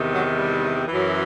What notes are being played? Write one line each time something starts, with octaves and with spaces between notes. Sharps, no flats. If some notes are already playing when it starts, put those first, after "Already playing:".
Already playing: E2 C3 D#3
F#3
G3
E3
F#2